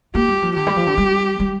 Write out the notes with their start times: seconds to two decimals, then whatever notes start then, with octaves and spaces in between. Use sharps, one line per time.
0.15 A#3 G4
0.28 G3
0.42 F3
0.56 D3 G4
0.67 G3
0.76 F3
0.87 D3
0.98 G3
1.40 G3